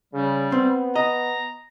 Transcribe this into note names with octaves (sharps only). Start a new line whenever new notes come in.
C#3 G3
B3 C4
D#5 A#5